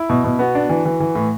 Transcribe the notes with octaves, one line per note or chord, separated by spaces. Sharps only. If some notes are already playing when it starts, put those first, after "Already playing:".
Already playing: E4
B2
B2
B3 F#4
D4
E3
E3
E3
A2